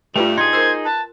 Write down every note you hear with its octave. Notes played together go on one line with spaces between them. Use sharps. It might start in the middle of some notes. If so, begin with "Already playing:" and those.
G2 A3 F4 B4 G5
D#4 G#4 C6 G#6
A#3 A#4 C5 E6
B4 A5